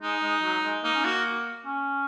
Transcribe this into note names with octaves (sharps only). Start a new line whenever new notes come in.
G#3 D#4
G#3
F#3
G#3
A#3 D#4
C#4
A#3 F#4
C#4